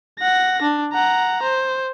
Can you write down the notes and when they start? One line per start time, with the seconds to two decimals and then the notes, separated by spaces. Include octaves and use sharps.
0.19 F#5 A#6
0.62 D4
0.92 F#5 A#5
1.43 C5